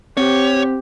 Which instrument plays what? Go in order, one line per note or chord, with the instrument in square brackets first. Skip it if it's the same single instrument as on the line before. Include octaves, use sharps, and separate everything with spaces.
[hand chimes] C4 C5 [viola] G4 [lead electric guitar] C#5